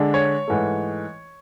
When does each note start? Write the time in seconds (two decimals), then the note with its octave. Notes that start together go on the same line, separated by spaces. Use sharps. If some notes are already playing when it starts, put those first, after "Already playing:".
Already playing: D3 G#3 D4
0.14 C#5
0.48 G#2 E3 A3